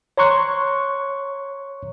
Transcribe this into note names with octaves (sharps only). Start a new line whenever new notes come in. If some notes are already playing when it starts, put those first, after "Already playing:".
C#5 A#5 C6 C#6 F#6